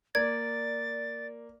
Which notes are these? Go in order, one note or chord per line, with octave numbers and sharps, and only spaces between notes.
A#3 D5 G#6 A6